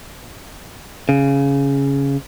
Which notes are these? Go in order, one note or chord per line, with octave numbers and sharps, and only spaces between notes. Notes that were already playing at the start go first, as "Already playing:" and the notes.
C#3